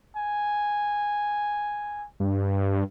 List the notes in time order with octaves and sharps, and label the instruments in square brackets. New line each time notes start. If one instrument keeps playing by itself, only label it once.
[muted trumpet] G#5
[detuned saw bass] G2